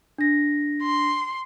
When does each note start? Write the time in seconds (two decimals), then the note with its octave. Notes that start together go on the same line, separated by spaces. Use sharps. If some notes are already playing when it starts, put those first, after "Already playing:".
0.18 D4 A#6
0.83 C6